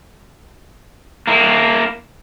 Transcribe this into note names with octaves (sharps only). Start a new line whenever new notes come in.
A#3 E4